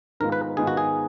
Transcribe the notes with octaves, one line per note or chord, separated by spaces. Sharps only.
G#2 D#3 G#3 B3 F4 A#4
B4
G#2 D#3 G#3 B3 F4 G#4
F#4
G#4